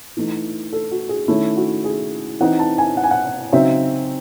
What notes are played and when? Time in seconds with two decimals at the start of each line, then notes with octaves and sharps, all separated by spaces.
0.17 E3 A3 D#4
0.72 A4
0.91 F#4
1.09 G#4
1.28 D#3 A3 C#4 E4
1.57 F#4
1.84 G#4
2.40 E3 C4 D#4 F#5
2.59 A5
2.78 G#5
2.97 F#5
3.04 G#5
3.11 F#5
3.52 C#3 F#3 C4 D#4 E5